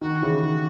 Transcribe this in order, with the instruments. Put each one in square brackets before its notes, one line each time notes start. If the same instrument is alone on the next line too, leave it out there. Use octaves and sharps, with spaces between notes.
[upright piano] D#3 [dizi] F#4
[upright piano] C#3 E3
D#3